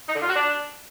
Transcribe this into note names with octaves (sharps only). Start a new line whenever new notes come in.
D#4
D3
F4
F#4
D4